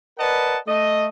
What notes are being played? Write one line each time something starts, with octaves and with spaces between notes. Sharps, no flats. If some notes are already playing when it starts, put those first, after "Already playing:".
A#4 B4 D5 D#5 F#5 A5
A3 D#5